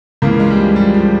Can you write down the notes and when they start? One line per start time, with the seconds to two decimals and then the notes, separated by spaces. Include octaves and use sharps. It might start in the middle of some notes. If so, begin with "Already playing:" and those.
0.22 C#2 C#3 E3 A#3
0.40 G#3
0.50 G3
0.58 F3
0.76 G3
0.94 F3